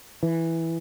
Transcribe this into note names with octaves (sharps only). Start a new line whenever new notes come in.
E3